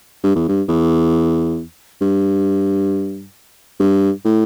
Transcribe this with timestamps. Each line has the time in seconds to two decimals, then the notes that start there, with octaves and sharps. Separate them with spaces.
0.24 G2
0.35 E2
0.48 G2
0.68 E2
2.01 G2
3.80 G2
4.25 A2